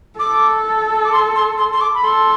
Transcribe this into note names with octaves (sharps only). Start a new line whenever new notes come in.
A4 D6
D6
C6
C6
C6
C6
D6
B5
A4 C6